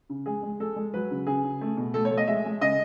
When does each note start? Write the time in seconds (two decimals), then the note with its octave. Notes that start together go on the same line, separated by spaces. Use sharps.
0.09 C#3
0.26 G#3 G#4
0.43 G#3
0.60 G#3 A4
0.76 G#3
0.94 F#3 B4
1.11 C#3
1.27 C#3 G#4
1.43 C#3
1.61 A3
1.77 B2
1.94 A3 A4
2.05 C#5
2.11 A3
2.17 D#5
2.28 G#3 E5
2.45 G#3
2.61 C#3 D#5